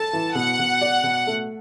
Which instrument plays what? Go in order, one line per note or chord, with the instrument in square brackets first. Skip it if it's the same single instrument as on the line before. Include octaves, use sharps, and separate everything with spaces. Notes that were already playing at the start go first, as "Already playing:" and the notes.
Already playing: [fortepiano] A4 [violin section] A5
[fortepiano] E3
[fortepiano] B2 [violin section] F#5
[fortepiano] B2
D5
B2
A3